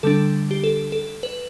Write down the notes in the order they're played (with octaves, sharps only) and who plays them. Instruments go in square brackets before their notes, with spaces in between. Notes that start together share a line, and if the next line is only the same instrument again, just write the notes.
[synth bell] D3 G3 D4 A4
G4
A4
A4
B4